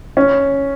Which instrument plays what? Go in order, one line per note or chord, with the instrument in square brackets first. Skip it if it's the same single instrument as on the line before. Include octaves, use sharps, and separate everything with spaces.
[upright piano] C#4